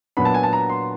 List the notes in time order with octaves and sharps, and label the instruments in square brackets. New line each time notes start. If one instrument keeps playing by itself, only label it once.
[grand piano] A#2 F#3 B3 D4 B5
A5
G#5
A5
A#5
C6